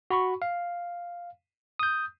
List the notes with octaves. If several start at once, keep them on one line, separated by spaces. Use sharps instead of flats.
F#4 B5 C#6
F5
D#6 G6